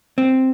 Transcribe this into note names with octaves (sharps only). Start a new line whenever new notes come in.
C4